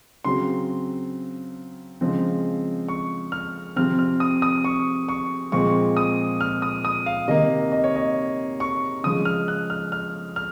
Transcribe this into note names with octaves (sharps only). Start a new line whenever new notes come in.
C#3 F#3 C4 C6
C#3 F3 G#3 C4
C#6
F6
C3 F3 C4 F6
F6
D#6
D#6
C#6
C#6
A#2 F3 G#3 C4 C#6
D#6
F6
D#6
D#6
F5
C3 D#3 A#3 D#5
D#5
C#5
D#5
C#6
C#3 F3 G#3 D#6
F6
F#6
F6
F6
F6